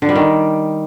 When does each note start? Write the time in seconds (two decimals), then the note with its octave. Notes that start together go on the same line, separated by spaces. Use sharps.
0.02 D3
0.09 G3
0.15 D#3